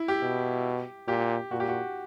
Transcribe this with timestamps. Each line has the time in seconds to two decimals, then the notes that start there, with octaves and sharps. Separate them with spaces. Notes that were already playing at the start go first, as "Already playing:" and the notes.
Already playing: E4
0.08 G4
0.23 B2
1.08 A#2 G4
1.51 A#2 F#4
1.60 G4
1.68 F#4